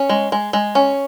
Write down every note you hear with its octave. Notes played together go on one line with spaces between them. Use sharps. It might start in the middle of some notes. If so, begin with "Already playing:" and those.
Already playing: C#4
G#3
G#3
G#3
C#4